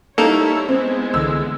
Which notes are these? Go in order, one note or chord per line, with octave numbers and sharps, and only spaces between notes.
G3 A#3 D#4 E4 A4 C#5 F7
G#3 B3 C4 E4
C2 D3 E3 E6